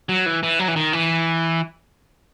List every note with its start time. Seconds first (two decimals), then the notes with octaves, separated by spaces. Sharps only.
0.09 F#3
0.26 E3
0.43 E3
0.59 F#3
0.68 E3
0.76 D#3
0.93 E3